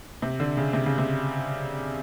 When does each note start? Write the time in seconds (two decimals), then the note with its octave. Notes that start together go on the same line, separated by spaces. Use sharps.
0.22 C3
0.40 D3
0.57 C#3
0.73 C3
0.86 C#3
0.98 C3